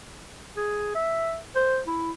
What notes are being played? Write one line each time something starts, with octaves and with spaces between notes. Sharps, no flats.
G#4
E5
C5
E4